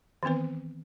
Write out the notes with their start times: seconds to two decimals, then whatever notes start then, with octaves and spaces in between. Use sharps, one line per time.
0.23 D#3 E3 B3 C4 B4